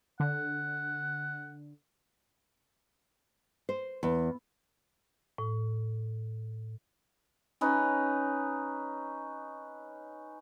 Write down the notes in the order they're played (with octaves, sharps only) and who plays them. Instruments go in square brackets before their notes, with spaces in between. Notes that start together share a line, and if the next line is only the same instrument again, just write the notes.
[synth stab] D3 [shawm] F#5
[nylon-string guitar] C5
E2
[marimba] A2
[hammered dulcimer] C#4 D#4 B4